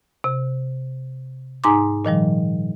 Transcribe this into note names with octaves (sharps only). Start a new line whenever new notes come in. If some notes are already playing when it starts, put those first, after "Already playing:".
C3
G#2 D#4 G#5 A#5 C6 D6
A#2 D#3 F3 G3